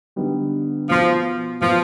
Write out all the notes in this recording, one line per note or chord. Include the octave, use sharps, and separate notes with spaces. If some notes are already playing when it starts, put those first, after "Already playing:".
D3 G3 B3 D#4
B2 F3 B3 F4
B2 F3 B3 F4